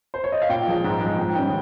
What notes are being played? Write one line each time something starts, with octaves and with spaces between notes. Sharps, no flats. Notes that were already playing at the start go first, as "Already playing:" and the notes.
C5
C#5
D#5
F5
A#2 G5
F3 G#3
G#2
F3 G#3
G#2 G5
D#3 G3 C#4 G5